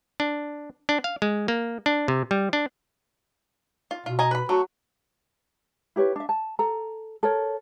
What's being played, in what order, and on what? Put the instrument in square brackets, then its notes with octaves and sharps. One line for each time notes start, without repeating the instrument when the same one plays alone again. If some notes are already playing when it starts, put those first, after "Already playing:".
[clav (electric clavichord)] D4
D4
F5
G#3
A#3
D4
C3
G3
D4
[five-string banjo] F4
[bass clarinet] B2 [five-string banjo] F4
[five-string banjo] D#5 G#5 A#5
B4 B5
[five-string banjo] F#3 A3 [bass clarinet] F#4
[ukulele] E4 G4 B4 C#5
D4 E5
A5
A4 A#5
A4 A#4 C#5